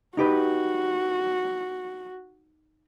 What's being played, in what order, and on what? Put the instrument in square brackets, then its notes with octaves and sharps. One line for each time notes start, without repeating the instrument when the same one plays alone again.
[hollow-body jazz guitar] D#4 G4 B4 [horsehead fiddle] F#4